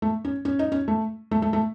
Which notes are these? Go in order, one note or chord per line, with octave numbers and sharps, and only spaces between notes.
A3
C#4
C#4
D#4
C#4
A3
A3
A3
A3